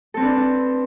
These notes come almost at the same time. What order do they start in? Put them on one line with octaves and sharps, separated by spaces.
A4 C4 B4 D4